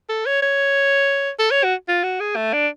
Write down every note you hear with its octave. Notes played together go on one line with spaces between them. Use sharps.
A4
C#5
C#5
A4
C#5
F#4
F4
F#4
G#4
A3
D4